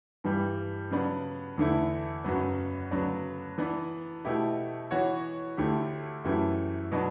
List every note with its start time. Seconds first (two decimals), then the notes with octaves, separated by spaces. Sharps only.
0.24 G2 E3 G3
0.91 C#3 F#3 B3 D4
1.58 E2 D3 A3 E4
2.24 F#2 C#3 F#3 B3
2.91 D2 C#3 F#3 B3 D4
3.58 E3 B3 D4
4.25 B2 A3 E4 G4
4.91 E3 B3 F#4 C#5
5.57 D2 D3 A3 E4 G4
6.24 F#2 E3 A3 E4 G4
6.92 B2 F#3 B3 D4